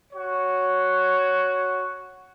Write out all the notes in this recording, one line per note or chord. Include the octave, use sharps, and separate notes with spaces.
F#4 C#5